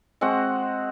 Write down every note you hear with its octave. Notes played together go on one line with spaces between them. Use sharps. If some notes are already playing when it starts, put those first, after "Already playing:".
G#3 C4 F#4 F#5